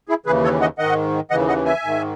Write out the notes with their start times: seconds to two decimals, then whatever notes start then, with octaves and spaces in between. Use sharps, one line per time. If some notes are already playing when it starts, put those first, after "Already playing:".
0.09 E4 G#4
0.26 D#2 C#3 E3 G#4 B4
0.44 A4 C#5
0.61 D#5 F#5
0.78 G#2 D#3 D#5 F#5
1.30 D#2 C#3 E3 D#5 F#5
1.48 D#5 F#5
1.65 E5 G#5
1.84 G#2 D#3